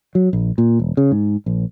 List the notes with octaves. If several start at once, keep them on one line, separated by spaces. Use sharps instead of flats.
F#3
A#1
A#2
E1
C#3
G#2
A#1